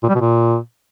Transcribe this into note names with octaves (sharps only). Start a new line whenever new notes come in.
A#2
G3
B2
A#2